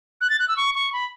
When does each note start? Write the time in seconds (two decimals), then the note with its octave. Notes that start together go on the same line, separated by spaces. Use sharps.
0.21 F#6
0.30 A6
0.39 F#6
0.48 E6
0.57 C#6
0.75 C#6
0.93 B5